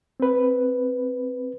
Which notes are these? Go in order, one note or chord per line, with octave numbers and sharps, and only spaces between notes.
C4 B4